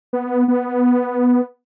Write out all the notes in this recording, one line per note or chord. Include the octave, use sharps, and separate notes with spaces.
B3
B3